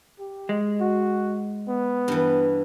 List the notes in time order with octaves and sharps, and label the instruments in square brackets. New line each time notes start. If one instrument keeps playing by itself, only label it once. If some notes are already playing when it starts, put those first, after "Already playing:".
[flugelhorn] G4
[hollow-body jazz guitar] G#3
[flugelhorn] F#4
B3
[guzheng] G2 E3